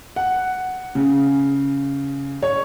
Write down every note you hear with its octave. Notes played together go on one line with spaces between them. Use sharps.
F#5
C#3
C#5